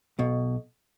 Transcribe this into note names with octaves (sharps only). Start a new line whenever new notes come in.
B1 B2